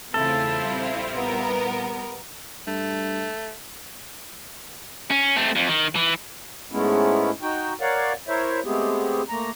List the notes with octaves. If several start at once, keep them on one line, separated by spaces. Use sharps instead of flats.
E2 C#3 A3 C4 E4 F4 A4
A#1 G3
B3 A#4
G2 A3
C#4
A3 C4
F2
D#3
E3
G#2 G#3 A3 B3 C#4 E4
D#4 F#4 G5
A#4 C#5 D5 F5 F#5
E4 A#4 C5 C#5 E5
G#3 A3 B3 C4 G4 G#4
A3 A#3 A#5